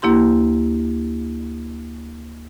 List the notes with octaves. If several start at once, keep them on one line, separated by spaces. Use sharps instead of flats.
D2 A#3 E4 G4 C6